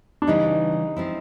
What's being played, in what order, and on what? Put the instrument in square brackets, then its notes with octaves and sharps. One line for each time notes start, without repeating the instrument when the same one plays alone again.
[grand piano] D4
[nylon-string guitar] C#3 E3 G3 B3 [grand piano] D#4
[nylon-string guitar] F3 G#3 C4 E4